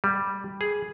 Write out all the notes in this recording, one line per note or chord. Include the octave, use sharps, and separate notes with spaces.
G3
G#4